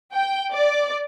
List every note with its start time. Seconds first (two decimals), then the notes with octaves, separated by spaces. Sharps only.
0.13 G5
0.52 D5